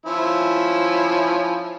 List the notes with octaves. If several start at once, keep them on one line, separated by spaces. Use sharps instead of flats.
F3 C#4 E4